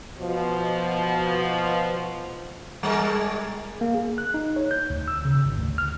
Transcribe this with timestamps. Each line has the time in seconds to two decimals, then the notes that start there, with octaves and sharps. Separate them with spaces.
0.17 B2 F3
2.83 G3 G#3 A#4
3.81 A#3
3.95 G#4
4.18 F#6
4.34 D#4
4.56 C#5
4.71 G6
4.90 D2
5.08 E6
5.25 C#3
5.45 G#1
5.58 D2
5.78 F6